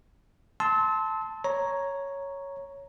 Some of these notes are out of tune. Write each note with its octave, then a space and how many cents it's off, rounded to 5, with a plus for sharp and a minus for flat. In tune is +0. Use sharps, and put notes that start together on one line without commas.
A5 +0 C6 +0 E6 -35
C#5 +0 A#5 +5